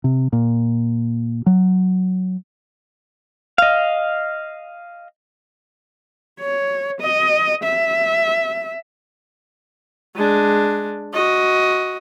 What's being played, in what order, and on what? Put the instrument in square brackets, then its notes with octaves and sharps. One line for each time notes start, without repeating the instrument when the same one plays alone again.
[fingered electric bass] C3
A#2
F#3
[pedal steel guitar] D#5 F5
[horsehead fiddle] C#5
D#5
E5
[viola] G#3 D4
F#4 D#5